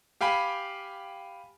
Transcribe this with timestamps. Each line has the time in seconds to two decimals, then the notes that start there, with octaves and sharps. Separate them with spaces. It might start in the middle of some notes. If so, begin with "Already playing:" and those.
0.21 G4 F5 G5 G#5 B5